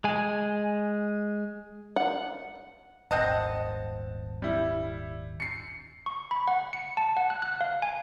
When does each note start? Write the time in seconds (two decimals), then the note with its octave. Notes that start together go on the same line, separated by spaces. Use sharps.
0.04 G#3 G#5
1.96 F#5
3.11 D#1 G#1 C4 D#5 F#5 A5
4.42 G3 E4
5.40 C7 C#7
6.06 C#6
6.31 B5
6.48 F#5
6.73 C#7
6.97 A5
7.17 F#5
7.30 F#6
7.42 F#6
7.61 F5
7.82 G#5